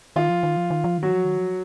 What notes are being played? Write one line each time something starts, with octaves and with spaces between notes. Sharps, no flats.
D#3 F4
F3
D#3
F3
D#3
F3
D#3 F#3 F#4
F3
D#3
F3